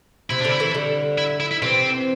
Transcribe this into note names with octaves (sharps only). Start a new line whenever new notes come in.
C3 E4
D4
D3 G3 E4
E3 A3
D3 G3
E4
E4
E4
C3 E3 C4